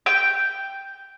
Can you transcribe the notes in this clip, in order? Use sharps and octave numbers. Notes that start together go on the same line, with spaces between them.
G5